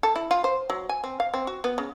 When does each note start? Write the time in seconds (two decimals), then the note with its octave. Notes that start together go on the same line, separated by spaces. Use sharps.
0.03 A4
0.16 E4
0.31 F4
0.44 C5
0.70 F#3
0.89 G#5
1.04 C4
1.20 F5
1.34 C4
1.47 F#4
1.64 B3
1.78 C#3